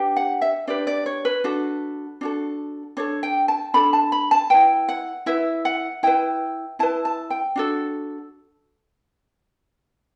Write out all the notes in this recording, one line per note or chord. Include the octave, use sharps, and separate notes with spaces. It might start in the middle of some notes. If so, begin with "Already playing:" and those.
Already playing: D4 G4 B4
F#5
E5
D4 G4 B4 D5
D5
C#5
B4
D4 F#4 A4
D4 F#4 A4
D4 A4 C#5
G5
A5
D4 A4 B5
A5
B5
A5
E4 B4 G5
F#5
E4 B4 E5
F#5
E4 B4 G5
E4 B4 A5
A5
G5
D4 F#4 A4